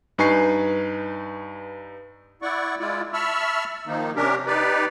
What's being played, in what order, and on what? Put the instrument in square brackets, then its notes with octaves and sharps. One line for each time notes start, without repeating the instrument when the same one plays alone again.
[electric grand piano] G2 D#4 B4 G#5 C#6 C7
[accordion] E4 D5 F#5 C#6
G#3 E4 F4 D5
E5 A5 B5 C#6 E6 F6
D#3 F3 A#3 D#4
C3 C#4 D4 G4 A#4
D#4 G4 B4 D5